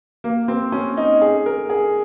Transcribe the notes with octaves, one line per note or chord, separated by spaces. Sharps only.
A#3
C4
C#4
D#4
G#4
A#4
G#4